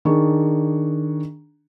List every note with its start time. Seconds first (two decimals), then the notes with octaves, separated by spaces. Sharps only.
0.05 D#3 D4 G#4 C#6